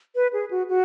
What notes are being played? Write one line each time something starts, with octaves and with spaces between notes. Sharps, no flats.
B4
G#4
F#4
F#4